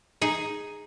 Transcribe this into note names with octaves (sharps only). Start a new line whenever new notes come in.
D#4 G#4